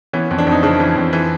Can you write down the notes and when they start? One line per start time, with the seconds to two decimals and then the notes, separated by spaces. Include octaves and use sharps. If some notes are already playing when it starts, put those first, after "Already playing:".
0.13 E3 B3 C#4
0.31 F2
0.38 C4 D4
0.47 F2
0.52 D#4
0.63 C#3 C4 D4
0.80 E3
0.96 F2
1.13 E3